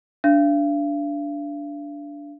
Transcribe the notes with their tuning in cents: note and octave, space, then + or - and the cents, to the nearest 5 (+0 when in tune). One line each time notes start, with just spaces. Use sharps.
D4 -15 F5 -40